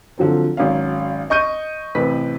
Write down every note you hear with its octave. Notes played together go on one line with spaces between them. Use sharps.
D3 F3 F#3 C4
G#1 F#3 C#4 F5
D#5 C#6 G6 D#7
A1 C3 B4 B6